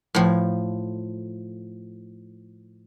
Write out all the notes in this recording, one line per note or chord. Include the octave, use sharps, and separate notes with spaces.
A2 F3